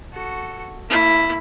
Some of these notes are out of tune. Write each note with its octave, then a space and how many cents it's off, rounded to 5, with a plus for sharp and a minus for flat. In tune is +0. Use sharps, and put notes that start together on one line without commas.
F#4 +0 A4 +0
A#3 -40 E4 +0